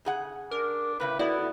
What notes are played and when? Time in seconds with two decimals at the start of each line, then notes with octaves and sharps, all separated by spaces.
0.05 C#3 G#4 F#5
0.51 D4 A#4
1.00 A2 C#3 E4 B4
1.19 A3 B3 E4 F#4 D5